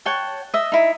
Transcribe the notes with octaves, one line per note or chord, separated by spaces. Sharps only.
C#5 F#5 G5 A5
D#5 E5
D#4 E4